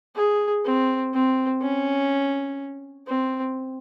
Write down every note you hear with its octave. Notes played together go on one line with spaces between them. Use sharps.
G#4
C4
C4
C#4
C4